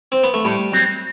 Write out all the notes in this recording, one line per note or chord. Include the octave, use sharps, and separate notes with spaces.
C4
B3
A3
A2 G3
F#3 C4